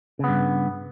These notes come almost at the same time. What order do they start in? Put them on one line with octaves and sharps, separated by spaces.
C#3 B3 G2